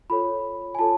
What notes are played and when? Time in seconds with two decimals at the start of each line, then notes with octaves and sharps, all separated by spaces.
0.10 F4 A4 C#5 B5
0.75 G#5
0.79 F4 A4 C#5 A5